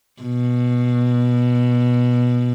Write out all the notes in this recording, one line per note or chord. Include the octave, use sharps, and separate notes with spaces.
B2